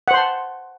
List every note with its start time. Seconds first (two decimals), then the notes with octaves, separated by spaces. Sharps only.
0.08 F#5
0.11 C5
0.14 C6
0.17 A5